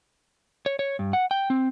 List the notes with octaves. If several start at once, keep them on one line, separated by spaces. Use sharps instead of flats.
C#5
C#5
G2
F#5
G5
C4